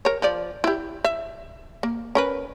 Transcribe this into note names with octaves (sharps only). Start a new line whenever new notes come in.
A#4 C#5
F3 D5
E4 G4
E5
A#3
C#4 A#4 B4